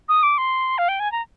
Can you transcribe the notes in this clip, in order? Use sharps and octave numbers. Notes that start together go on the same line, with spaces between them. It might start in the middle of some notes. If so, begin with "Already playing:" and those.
D#6
D6
C6
F5
G5
G#5
A#5